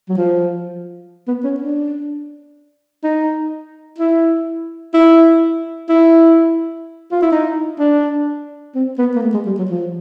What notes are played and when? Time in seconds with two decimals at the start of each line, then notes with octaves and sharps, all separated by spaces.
0.09 F#3
0.17 F3
1.28 B3
1.44 C#4
1.60 D4
3.04 D#4
3.99 E4
4.94 E4
5.89 E4
7.12 F4
7.22 E4
7.32 D#4
7.79 D4
8.75 C4
8.98 B3
9.16 A#3
9.22 A3
9.34 G#3
9.46 G3
9.59 F#3
9.70 F3